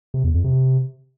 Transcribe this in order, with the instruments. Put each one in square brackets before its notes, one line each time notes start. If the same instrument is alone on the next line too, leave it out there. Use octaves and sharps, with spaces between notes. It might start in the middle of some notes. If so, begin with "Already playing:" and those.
[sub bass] C3
E2
F2
C3